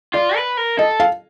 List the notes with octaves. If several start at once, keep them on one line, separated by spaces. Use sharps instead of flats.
F4 D5
B4
A#4
A4 D#5
F5